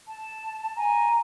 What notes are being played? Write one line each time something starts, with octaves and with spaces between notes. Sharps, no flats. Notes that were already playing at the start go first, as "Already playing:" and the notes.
A5
G#5 A#5